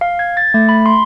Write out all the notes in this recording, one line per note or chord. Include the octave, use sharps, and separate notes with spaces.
F5
G#6
A6
A3
B5
C6